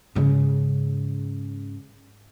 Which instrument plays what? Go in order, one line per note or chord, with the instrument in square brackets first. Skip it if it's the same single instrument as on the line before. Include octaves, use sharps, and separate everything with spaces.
[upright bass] G#2 C#3